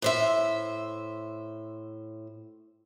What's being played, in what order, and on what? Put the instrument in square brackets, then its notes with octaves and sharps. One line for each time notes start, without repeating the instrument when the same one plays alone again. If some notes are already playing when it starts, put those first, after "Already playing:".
[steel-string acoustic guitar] A2 C5 E5